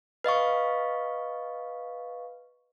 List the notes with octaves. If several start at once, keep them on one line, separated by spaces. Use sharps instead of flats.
B4 D#5 F5 C#6